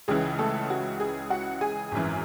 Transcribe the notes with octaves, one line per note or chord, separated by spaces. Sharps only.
C#2 C#3 E3 G#4
A3 A4
F#4
G#4
F#4 F#5
G#4 G#5
G#1 F#2 E3